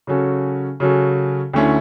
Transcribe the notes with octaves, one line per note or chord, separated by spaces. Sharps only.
C#3 F#3 C#4 F#4 A4
C#3 F#3 C#4 F#4 A4
D2 D3 A3 C#4 E4